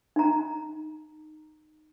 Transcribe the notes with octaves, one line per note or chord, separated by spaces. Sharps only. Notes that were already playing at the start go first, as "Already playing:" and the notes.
D#4 A#5